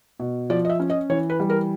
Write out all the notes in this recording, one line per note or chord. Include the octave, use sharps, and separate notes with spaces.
B2
F3 D5
D#5
E5
C#4
D#5
E3 C#5
B4
G3
A#4